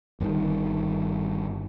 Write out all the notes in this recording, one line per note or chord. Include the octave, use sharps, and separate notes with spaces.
G1 G2 A#2 D#3